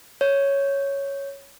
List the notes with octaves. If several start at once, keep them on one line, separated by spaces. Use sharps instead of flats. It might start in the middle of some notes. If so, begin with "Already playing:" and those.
C#5